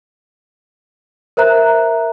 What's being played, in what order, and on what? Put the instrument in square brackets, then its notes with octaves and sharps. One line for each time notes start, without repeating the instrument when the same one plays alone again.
[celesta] A#4 C5 E5 A#5 F#6